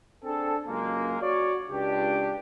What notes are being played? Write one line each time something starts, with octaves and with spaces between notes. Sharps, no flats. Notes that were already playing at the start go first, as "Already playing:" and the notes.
C4 D4 G#4 A4
C#2 F#2 G#3 A#3
F#4 C#5 D5
C#2 D4 G4